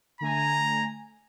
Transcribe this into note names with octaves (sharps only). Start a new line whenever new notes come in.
D3 A3 G#5 A#5